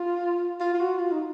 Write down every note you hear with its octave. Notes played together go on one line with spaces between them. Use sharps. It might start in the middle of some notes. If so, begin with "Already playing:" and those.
Already playing: F4
F4
F4
F#4
F4
D#4